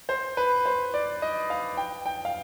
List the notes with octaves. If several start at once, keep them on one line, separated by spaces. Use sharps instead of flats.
C5
B4
C5
D5
D#5
F5
G5
G5
F5